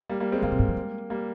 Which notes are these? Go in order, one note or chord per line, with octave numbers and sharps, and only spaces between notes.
G3 A#3
G3 A#3
G#3 C4
D3 G3 A#3
C3
G#2
F3
G#3
G3 A#3